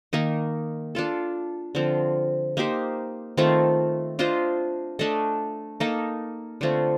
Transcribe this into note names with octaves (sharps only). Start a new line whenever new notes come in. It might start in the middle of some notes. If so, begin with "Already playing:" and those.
D#3 A#3 D#4
D4 F4 A4
D3 F3 C4 F4
A#3 D#4 G4 C5
D#3 A3 C4 F4
D4 F4 C5 D#5
A3 D4 A4 D#5
A#3 D#4 A4
D3 A3 C4 F4